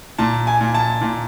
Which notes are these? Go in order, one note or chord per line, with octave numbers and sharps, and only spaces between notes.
A#2 A5
G#5
A#2
A5
A#2